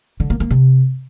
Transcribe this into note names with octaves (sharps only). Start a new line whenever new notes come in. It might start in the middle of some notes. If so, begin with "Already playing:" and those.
D3
A#3
A#3
C3